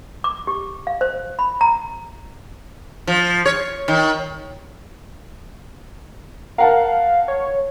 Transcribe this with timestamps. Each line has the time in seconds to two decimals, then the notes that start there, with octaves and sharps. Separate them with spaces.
0.24 D6
0.47 G4
0.87 F5
1.01 C5
1.39 B5
1.61 A#5
3.07 F3
3.46 C#5
3.88 D#3
6.58 A#4 F5 F#5 A5
7.28 C#5